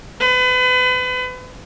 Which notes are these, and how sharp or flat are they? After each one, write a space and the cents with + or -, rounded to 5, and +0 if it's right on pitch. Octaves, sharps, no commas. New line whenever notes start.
B4 +35